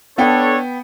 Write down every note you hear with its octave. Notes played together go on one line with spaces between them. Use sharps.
B3 D4 A4 C#5 G5